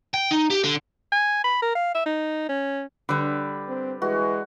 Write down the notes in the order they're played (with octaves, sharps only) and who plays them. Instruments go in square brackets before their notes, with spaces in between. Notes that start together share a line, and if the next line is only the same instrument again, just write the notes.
[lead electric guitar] G5
D#4
G4
D3
[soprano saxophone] G#5
B5
A#4
F5
E5
D#4
C#4
[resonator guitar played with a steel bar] D3 G3 [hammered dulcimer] B4 D5
[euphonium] C4
[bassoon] E3 [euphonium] G#3 [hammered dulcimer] F#4